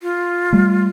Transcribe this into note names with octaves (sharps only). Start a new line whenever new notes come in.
F4
G3 A3